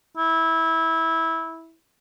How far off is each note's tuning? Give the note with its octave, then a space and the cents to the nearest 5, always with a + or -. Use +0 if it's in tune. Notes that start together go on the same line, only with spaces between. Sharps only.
E4 -15